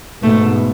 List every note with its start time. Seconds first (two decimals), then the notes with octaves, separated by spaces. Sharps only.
0.23 G#2 B2 A3